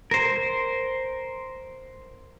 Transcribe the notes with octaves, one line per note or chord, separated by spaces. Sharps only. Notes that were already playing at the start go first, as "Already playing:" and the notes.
A#4 C5